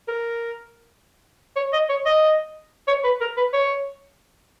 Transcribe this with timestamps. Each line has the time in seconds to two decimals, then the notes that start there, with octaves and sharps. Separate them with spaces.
0.08 A#4
1.56 C#5
1.73 D#5
1.89 C#5
2.06 D#5
2.88 C#5
3.04 B4
3.21 A#4
3.37 B4
3.54 C#5